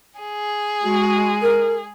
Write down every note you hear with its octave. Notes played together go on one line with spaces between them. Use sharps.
G#4
G#3 F#4
A#4